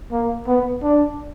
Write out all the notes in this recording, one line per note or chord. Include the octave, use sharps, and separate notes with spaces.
A#3
B3
D4